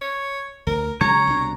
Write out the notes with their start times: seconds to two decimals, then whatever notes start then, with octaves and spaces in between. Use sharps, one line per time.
0.01 C#5
0.67 D2 A#4
1.01 C#3 F#3 G#3 C#5 A#5
1.27 C2 B2 D4